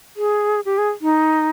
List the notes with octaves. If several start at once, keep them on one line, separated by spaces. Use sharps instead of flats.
G#4
G4
G#4
D#4